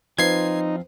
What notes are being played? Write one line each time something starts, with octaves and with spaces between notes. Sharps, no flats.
F3 C4 D#4 F4 B4 C5 G#6 C7